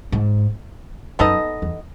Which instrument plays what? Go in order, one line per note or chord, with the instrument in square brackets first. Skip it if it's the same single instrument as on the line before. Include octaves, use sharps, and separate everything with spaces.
[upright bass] G#2
[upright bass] F#2 [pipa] B3 D#4 A4 D#5
[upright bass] E2